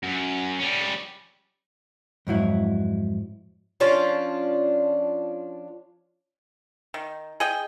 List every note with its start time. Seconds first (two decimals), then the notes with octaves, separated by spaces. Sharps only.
0.03 F#2
0.59 G3 C#4
2.27 F2 G#2 F#3 E4
3.80 F3 C#4 D4 F4
6.94 D#3
7.40 G#4 D#5 G5